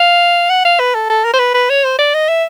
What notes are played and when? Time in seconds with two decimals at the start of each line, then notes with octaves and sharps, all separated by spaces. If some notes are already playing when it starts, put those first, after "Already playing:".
Already playing: F5
0.50 F#5
0.65 F5
0.79 B4
0.94 A4
1.10 A4
1.24 A#4
1.33 C5
1.39 B4
1.54 B4
1.69 C#5
1.84 C5
1.98 D5
2.14 D#5
2.28 E5